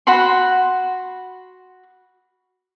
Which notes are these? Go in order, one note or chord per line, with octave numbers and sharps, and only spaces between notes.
F#4 F#5 B5 C6